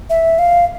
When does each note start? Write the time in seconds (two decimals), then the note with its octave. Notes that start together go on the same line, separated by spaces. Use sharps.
0.10 E5
0.39 F5